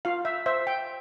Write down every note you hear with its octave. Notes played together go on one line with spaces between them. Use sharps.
F4 F5
E5
C5 E5
G5